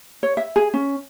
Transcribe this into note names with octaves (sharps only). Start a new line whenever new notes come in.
C#5
E5
G#4
C#4